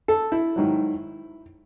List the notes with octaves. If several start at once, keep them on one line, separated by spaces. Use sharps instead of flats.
A4
E4
G#2 D#3 F#3